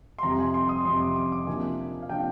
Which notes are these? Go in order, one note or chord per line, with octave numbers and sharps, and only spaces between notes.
C6
F2 C3 G3 A#5
G#5
C6
D#6
F2 C3 G3 C6
D6
D6
D6
C3 F3 A#3 D4 G#5
F5
C3 F3 A#3 D4 G5